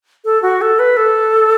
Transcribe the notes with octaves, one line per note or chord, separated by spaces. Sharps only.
A4
F#4
A4
B4
A4